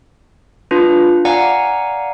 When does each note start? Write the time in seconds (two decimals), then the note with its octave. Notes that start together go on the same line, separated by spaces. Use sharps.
0.71 D4 F4 B4
1.25 D5 F5 F#5 G#5 A#5